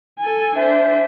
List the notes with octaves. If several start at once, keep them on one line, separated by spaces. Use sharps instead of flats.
A4 G#5
D4 C5 E5